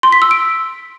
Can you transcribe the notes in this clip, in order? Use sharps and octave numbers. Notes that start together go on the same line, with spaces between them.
C6
B6
E6
D7